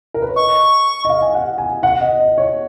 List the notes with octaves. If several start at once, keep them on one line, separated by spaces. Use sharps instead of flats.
A#4
B4
C#5
D#5 C#6
D#5
F5
G#5
F#5
G#5
F#5
D#5
D#5
C#5